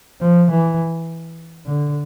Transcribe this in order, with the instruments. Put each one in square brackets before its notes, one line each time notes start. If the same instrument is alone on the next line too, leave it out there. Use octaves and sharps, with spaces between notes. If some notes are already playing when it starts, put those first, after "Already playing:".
[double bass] F3
E3
D3